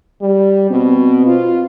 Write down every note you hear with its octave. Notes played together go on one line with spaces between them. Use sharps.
G3
B2 C4
F4